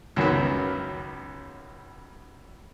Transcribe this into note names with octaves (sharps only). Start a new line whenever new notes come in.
C#2 F#2 D#3 F#3 B3